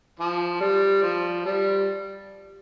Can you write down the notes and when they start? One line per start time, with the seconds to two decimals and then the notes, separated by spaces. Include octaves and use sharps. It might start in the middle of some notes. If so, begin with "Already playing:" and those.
0.19 F3
0.61 G3
1.03 F3
1.45 G3